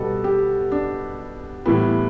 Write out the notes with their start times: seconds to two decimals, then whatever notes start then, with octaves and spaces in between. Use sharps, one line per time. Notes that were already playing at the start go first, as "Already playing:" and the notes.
Already playing: B2 G3 A4
0.24 G4
0.72 D4
1.66 A2 E3 G3 B3